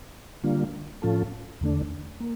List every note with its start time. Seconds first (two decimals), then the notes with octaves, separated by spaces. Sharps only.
0.44 D3 G3 A#3 D4 F4
1.02 A2 F3 C#4 F4 A4
1.61 E2 D3 A3 D4
2.20 A#3